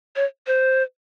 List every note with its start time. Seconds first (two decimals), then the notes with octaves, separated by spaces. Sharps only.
0.16 C#5
0.47 C5